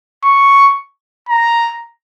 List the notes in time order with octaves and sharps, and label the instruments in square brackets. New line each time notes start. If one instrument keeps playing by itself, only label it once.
[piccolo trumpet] C#6
A#5